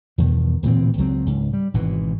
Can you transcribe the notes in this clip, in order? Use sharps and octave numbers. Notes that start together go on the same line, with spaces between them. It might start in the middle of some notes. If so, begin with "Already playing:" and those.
E2 G2 B2 D#3
D1 A#2 E3 C4
C#2 F#3 C4
C#2 G#2
G3
G#1 G#2 B2 E3